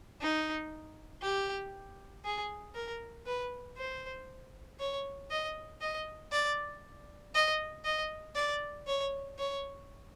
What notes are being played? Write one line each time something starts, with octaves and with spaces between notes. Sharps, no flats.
D#4
G4
G#4
A#4
B4
C5
C#5
D#5
D#5
D5
D#5
D#5
D5
C#5
C#5